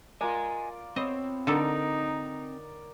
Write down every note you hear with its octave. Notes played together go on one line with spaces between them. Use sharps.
F4 A#4 D5 D#5 G#5
B3 C4 C#5 D#5
D3 D#4 A4 A#4 D5 F#5